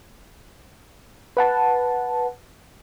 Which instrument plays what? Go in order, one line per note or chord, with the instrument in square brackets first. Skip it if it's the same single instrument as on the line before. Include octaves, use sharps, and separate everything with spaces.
[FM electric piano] B4 F#5 A5